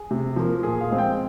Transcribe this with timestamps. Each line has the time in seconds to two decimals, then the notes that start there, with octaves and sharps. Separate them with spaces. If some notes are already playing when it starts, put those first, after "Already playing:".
Already playing: G#4
0.11 C3
0.36 F3 A#3
0.63 A#2 G#4
0.81 F5
0.90 G#3 C4
0.98 G5